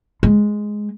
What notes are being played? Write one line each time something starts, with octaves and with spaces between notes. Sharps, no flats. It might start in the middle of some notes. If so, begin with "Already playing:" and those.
G#3